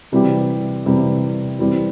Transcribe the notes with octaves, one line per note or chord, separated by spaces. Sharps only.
C3 E3 G3 C4 G4
C3 E3 G3 C4 G4
E3 G3 C4